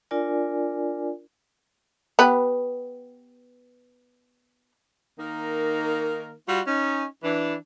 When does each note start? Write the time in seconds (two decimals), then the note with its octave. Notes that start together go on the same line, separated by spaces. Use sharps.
0.11 D4 F4 A#4 D5 G#5
2.19 B3 G4 B4
5.19 D#3 A#3 D#4 A#4
6.49 G3 F4 F#4
6.67 C#4 D#4
7.24 E3 D4